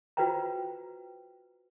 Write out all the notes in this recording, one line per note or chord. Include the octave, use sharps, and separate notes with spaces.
F4 F#4 B4 C5 G5 A#5